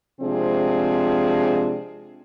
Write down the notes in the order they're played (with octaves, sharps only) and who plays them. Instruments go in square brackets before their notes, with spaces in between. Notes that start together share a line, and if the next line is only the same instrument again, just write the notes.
[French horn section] C3 F3 G#3 C4 D4 G#4